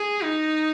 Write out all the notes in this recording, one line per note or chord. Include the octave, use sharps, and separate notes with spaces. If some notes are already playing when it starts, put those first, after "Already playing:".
Already playing: G#4
D#4